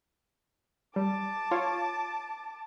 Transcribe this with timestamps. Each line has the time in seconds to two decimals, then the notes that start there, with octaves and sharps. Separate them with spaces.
0.96 G3 A5 D6
1.51 F4 C#5 F5